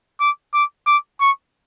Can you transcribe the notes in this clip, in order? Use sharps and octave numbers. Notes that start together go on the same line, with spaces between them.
D6
D6
D6
C#6